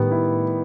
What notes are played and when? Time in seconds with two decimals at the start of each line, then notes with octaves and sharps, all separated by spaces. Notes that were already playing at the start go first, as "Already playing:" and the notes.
Already playing: A2 D#3 G3 B3
0.11 E4